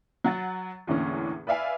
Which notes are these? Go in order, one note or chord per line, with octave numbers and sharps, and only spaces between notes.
F#3 F#5 A6
E2 A2 D3 E3 A#3 C#4
B4 D5 E5 F5 G#5